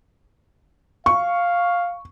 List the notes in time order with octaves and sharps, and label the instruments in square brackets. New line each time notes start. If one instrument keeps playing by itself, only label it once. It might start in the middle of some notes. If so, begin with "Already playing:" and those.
[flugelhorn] F5 [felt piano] C#6